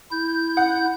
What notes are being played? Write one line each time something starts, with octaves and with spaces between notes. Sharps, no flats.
E4 G6
F#5